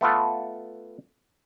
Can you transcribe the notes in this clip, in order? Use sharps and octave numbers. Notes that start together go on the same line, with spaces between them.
A3 B3 F4 A4